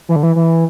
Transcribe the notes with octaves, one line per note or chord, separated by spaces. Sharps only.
E3
D3
E3
E3